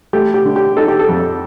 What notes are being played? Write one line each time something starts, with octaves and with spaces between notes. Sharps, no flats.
A3 G4
G4
D3
G4
D#4 A4
G4
A4
F2